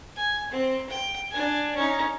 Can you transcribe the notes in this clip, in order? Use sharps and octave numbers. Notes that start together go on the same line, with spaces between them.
G#5
C4
G5
D4 G#5
C#4 D#4